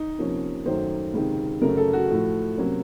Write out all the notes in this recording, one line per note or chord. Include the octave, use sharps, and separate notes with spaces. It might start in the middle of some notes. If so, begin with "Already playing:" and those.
Already playing: D#4
C3 F3 A#3 C#4
F#2 D#3 F#3 A3 C5
C#2 C3 D#3
F#2 C#3 A3 A#4
A4
F#4
A2 F3 A3
C3 F#3 A#3 C#4